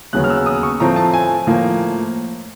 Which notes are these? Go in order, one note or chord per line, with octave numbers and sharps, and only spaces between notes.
D#2 C#3 F#3 B3 F#6
F6
E6
D#6
C#6
A2 F3 A3 C4 A#5
A5
G#5
A2 F3 A#3